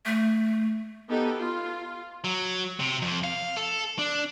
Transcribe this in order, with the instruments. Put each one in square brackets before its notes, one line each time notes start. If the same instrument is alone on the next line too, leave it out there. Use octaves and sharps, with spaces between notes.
[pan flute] A3
[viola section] B3 D#4 G4 A4
F4
[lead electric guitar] F#3
C3
F2
F5
A4
D4